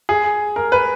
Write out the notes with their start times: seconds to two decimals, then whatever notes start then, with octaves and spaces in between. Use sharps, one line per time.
0.09 G#4
0.56 A#4
0.72 B4